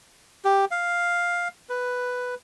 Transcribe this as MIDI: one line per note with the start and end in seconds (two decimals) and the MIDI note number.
0.45 0.65 67
0.71 1.48 77
1.69 2.35 71